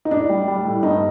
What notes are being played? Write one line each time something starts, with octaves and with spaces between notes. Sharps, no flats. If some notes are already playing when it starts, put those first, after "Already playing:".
D#4
A2 D4
G3
G3
A2
G2 D#4